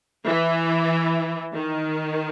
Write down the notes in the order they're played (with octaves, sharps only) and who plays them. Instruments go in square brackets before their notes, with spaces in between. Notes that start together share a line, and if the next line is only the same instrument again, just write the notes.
[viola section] E3
D#3